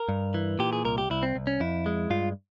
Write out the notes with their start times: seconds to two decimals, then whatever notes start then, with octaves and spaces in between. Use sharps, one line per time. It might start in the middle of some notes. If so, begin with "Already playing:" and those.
Already playing: A#4
0.09 G2
0.34 E3
0.59 A#2 G4
0.73 G#4
0.85 C2 A#4
0.98 G4
1.10 C2 E4
1.23 C4
1.36 C2
1.47 C#4
1.60 F2 E4
1.86 G#3
2.10 G2 F4